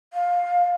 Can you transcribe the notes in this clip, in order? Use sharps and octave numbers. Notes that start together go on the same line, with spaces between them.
F5